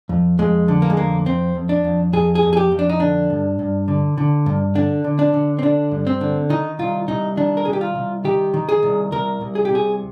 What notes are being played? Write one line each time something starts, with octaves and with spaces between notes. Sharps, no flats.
F2
F2 G#3
D3
A#3
G#3
F2 A#3
F2 C4
F2
D4
F2
F2 G#4
G#4
F2
G#4
G4
F2
D4
D#4
D3 D4
G2
G2
D3
D3
G2
D3 D4
D3
D4
D3
C4
D3 D4
G2
C4
D3
D#3 D#4
C2 F4
C2 D#4
D#3 D4
A#4
C2 G#4
G4
F4
C2
D#3 G4
D#3
G#4
C2
C2 A#4
C2
G#4
G4
C3 G#4